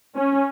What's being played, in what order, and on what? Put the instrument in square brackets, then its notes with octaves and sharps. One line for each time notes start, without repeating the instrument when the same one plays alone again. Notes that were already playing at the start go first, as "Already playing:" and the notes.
[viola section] C#4